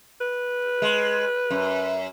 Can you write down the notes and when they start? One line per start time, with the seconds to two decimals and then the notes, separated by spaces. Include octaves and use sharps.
0.21 B4
0.82 G#3
1.50 F#2